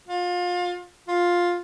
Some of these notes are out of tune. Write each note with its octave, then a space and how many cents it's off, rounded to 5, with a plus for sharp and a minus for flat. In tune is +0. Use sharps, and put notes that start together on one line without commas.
F4 +30
F4 +10